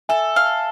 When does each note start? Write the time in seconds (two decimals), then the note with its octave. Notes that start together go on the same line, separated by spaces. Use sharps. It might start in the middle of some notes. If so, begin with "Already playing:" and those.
0.09 A4 E5 G#5
0.36 F5